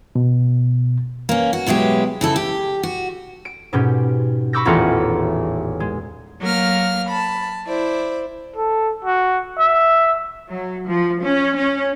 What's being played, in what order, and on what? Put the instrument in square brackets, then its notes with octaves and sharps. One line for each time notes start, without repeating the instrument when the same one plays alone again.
[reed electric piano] B2
[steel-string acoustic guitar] A#3 C#4
F#4
B2 F#3 G#3 E4 G4
C#3 E4 A4
G4
F#4
[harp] D7
G#2 B2 C#4 G4
B5 C#6 D6 E6 G6 A#6
D#1 A1 E2 F4 F#5 C#7
G#3
[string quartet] F#3 A#3 A#4 F5 F6
A5 B5
E4 C5 D5
[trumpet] A4
F#4
E5
[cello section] F#3
F3
C#4
C#4